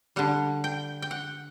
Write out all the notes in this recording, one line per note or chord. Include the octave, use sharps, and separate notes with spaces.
D3 G3 F#5
G5
G5
F#5